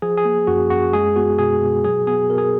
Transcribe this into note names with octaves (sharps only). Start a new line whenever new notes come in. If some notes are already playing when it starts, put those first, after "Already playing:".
F3 G#4
G#4
A#3
F#2 F#4
F#2 F#4
G#3 G#4
B3 F#4
B2 G#4
B2
F#3 G#4
B3 G#4
B2 A#4
G#4